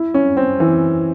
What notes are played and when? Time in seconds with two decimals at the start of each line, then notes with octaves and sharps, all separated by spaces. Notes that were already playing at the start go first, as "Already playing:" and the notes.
Already playing: E4
0.14 C#4
0.37 C4
0.60 E3